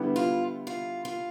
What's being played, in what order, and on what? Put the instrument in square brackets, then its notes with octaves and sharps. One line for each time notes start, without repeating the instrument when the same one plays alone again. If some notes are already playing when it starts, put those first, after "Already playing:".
Already playing: [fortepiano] D3 G3 B3 E4
[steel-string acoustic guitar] F4
F4
F4